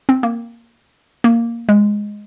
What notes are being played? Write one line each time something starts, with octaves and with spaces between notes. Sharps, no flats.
C4
A#3
A#3
G#3